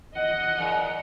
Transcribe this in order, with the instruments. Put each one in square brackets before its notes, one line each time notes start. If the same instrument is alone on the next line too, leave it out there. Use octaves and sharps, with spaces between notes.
[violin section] D#5 [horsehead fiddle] F#5
[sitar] E2 A#4